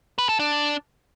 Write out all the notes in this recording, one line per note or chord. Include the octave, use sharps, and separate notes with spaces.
B4
A4
D4